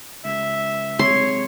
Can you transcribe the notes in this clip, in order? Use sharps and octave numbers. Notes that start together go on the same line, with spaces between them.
C#2 E5
C3 G#3 C#5 C6